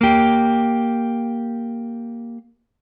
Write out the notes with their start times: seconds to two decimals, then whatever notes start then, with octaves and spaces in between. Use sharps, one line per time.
0.01 A#3 G4